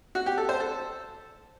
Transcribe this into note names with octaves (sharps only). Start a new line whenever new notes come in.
F#4
G4
A4
C5
A4